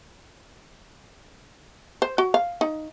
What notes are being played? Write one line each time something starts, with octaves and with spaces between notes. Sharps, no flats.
C5
F#4
F5
D#4